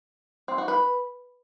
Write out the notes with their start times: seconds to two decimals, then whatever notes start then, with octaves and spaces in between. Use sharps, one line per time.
0.48 C4
0.58 F#4
0.68 B4